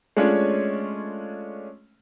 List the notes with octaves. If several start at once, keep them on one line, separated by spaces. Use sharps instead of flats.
G#3 A3 C#4 D4 F4 C#5